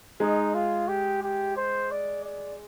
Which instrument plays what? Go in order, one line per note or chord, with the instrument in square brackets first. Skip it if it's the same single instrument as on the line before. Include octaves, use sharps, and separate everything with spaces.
[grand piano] G#3 [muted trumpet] D#4
[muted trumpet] F4
G4
G4
C5
D5
D5